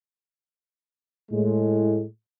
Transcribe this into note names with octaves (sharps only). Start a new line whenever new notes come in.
A2 G#3